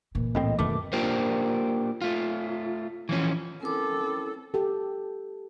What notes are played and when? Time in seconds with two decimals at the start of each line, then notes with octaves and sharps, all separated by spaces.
0.15 A#2 E3
0.35 C2 A2 C4 D#5
0.59 F#2 B2 D#3 A3 D6
0.93 A#3 D4 F4 G4 A#4 C5
2.02 A3 F4
3.09 E3 F3 C#4
3.63 C4 C#4 E4 A4 A#4 D6
4.54 G4 A4